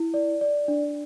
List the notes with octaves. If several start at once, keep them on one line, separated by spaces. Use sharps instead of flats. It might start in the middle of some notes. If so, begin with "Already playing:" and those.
Already playing: E4
D5
D5
D4